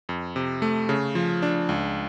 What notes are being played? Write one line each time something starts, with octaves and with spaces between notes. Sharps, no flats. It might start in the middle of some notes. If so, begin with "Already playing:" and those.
F2
C3
A3
C#3
F3
D4
C#2